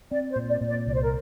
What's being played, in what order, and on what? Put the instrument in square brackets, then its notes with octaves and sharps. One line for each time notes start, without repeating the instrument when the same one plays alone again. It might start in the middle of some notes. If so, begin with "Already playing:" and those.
[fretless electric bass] C4 [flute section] D5
[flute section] C5
[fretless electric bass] A#2
[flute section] D5
[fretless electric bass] A#2
[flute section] D5
[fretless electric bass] C2 [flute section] D5
[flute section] C5
A#4